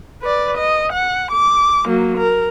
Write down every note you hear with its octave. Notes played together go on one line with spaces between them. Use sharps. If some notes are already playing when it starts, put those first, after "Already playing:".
B4 D5
D#5
F#5
D6
F#3 A#3
A#4